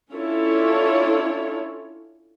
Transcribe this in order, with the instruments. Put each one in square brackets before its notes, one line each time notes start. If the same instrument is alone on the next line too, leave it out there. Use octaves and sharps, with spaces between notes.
[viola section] C#4 D4 E4 F4 A4 C#5